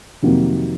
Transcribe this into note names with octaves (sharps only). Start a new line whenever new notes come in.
F2 C3 D#3 F#3 A#3